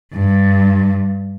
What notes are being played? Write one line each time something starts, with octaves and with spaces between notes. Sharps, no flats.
G2